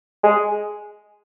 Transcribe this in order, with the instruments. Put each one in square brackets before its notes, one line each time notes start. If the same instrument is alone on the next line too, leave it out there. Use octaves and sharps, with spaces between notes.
[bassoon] G#3